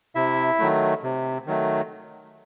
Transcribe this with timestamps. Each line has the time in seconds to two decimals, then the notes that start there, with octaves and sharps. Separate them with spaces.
0.15 C3 E4 E5
0.59 D#3 F#3 A3
1.03 C3
1.47 D#3 F#3 A3